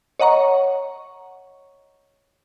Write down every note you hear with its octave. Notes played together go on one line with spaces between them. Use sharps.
C#5 D#5 F#5 A#5 C#6